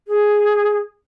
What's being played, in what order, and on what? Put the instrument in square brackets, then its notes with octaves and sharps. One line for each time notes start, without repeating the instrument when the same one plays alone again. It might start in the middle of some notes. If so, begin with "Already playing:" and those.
[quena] G#4